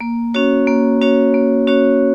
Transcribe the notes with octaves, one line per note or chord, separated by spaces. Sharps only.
A#3
C#4 F#4 C#5
A#3
C#4 F#4 C#5
A#3
C#4 F#4 C#5